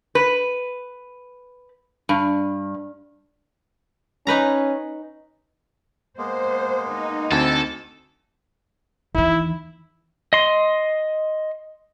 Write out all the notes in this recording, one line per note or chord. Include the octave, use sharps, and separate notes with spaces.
B4
G2
C#4 D#4 B4 A#5
G#3 A#3 B3 C5
D#4
D2 C4 A4 G#6
D#2 E3 E4
D#5 C6